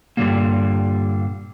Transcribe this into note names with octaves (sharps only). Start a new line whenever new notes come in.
G2 A#2 D3 D#3 G3 A#3